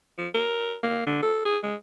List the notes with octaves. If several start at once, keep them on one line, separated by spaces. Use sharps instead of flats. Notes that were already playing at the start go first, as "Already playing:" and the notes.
F3
A#4
A#3
D3
A4
G#4
G#3